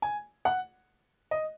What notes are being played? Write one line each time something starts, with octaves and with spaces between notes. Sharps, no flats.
G#5
F#5
D#5